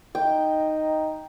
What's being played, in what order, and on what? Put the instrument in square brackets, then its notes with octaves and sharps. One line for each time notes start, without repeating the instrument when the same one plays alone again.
[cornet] D#4 [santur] G5